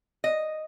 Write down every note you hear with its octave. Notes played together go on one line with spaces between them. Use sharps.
D#5